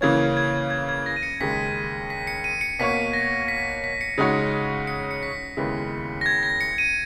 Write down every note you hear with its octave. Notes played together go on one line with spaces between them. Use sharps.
C#3 E3 A#3 C#4 G#6
G#6
G#6
G#6
A#6
D#7
C#7
D#2 C#3 G#3 B6
B6
C#7
D#7
C#7
B2 A#3 C#4 F#4 C#5 B6
A#6
B6
B6
C#7
C#3 G#3 D#4 F#4 C#5
C#7
C#7
B6
D#2 C#3 G#3 B3 E4
A#6
G#6
A#6
C#7
D#7